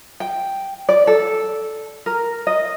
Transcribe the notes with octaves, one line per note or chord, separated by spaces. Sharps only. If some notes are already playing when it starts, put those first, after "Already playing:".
G5
D5
A4
A#4
D#5